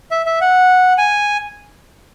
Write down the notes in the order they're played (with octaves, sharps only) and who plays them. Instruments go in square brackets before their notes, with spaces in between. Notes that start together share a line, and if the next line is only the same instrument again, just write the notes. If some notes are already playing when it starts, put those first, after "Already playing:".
[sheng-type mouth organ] E5
E5
F#5
G#5